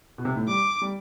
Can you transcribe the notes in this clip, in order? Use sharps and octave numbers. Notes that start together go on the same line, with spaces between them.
B2
C3
A2
G3 D6
G3